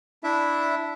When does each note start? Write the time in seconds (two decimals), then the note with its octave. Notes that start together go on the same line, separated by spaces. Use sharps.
0.23 D4 E4 E5